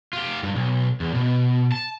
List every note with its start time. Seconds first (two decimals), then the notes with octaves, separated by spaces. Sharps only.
0.13 F4 G4
0.43 G2
0.55 B1
1.00 E2
1.14 B2
1.72 A5